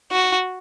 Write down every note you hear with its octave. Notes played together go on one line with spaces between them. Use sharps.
F#4